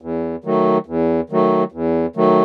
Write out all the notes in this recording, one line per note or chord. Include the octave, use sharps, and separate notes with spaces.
E2
D#3 F#3 A3
E2
D#3 F#3 A3
E2
D#3 F#3 A3